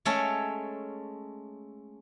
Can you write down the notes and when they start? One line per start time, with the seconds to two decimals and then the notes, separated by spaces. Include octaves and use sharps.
0.05 G#3 A3 C#4 A4 C#5